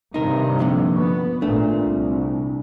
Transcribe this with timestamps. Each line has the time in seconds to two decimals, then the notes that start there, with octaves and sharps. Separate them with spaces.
0.14 G2 C3 D#3 D#4 A#4
0.59 F2 A#2 D3
0.96 B3 C#6
1.42 G#1 A#2 A3 D4
1.83 C2